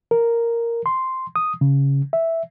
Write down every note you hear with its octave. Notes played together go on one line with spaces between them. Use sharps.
A#4
C6
D#6
C#3
E5